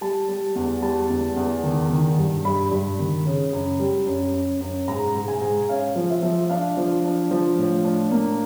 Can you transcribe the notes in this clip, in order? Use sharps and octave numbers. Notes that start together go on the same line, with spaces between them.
G3 A5
G3
E2
G3 A5
E2
E2
D#3
D#3
G2
G2 B5
G2
D#3
C#3
F#2
G3
F#2
F#2
F#2
G#2 A#5
G#2
G#5
G#2
C#4 F5
F3
E5
F3
D4 F5
F3
D4
F3
A2
D4
A#3